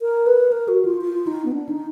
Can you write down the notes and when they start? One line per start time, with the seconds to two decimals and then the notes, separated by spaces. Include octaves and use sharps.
0.02 A#4
0.26 B4
0.52 A#4
0.68 F#4
0.85 F4
1.01 F4
1.27 D#4
1.45 B3
1.52 D4
1.69 D#4